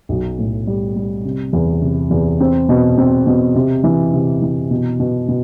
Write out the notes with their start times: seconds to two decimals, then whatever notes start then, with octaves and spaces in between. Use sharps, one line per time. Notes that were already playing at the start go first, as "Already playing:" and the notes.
0.09 B1
0.38 A2
0.67 G3
0.96 G3
1.25 C3
1.53 E2
1.82 C3
2.11 E2
2.40 C4
2.69 B2
2.98 C4
3.27 B2
3.55 C3
3.84 E3
4.14 C3
4.42 E3
4.71 B2
5.00 B2
5.29 B2